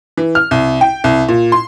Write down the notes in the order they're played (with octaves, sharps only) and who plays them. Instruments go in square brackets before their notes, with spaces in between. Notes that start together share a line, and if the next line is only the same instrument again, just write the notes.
[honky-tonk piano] E3
F6
C2
G5
C2
A#2
C6